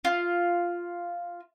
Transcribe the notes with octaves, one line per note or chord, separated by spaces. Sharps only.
F4